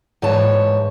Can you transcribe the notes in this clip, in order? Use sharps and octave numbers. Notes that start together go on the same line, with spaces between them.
G#2 E3 C#5 A5